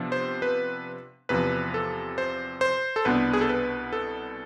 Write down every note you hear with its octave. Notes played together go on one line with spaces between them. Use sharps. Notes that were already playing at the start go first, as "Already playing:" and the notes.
Already playing: C3 F3 B3 D4
C5
B4
E2 C3 F3 B4
A4
C5
C5
A4
C2 B2 B3 D4 B4
G#4
A4
B4
A4